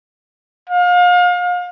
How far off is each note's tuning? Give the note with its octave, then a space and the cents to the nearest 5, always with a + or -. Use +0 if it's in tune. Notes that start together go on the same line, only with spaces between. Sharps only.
F5 +35